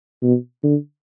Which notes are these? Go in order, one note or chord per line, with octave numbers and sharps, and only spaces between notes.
B2
D3